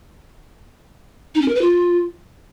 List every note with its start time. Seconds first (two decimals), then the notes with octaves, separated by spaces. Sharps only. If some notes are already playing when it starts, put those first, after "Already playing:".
1.35 D#4
1.42 C#4
1.48 A#4
1.55 B4
1.62 F4